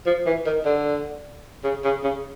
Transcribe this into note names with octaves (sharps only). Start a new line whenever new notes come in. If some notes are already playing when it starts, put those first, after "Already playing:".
F3
E3
D#3
D3
C#3
C#3
C#3